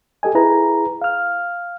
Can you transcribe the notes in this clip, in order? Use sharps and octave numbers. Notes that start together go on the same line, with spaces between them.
G4 A4 D#5 G#5
E4 G#4 B4 A#5
F5 F6